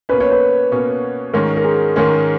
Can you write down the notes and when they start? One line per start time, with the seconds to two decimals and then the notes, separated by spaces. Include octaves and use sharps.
0.09 B2 A#3 C#4 B4
0.20 C#5
0.32 B4
0.72 B2 A#3 C#4
1.33 G#2 D#3 G#3 C#4 A#4
1.57 A#4
1.64 G#4
1.96 G#2 D#3 G#3 C#4 A#4